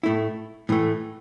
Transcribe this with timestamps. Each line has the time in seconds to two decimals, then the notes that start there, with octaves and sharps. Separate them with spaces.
0.03 A2 A3 E4
0.69 A2 E3 A3